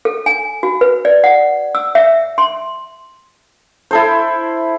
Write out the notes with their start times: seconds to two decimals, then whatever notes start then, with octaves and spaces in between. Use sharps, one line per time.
0.05 A4
0.26 G#5
0.63 F#4
0.81 B4
1.05 D5
1.24 F#5
1.75 E6
1.95 E5
2.38 C6
3.91 E4 A4 C5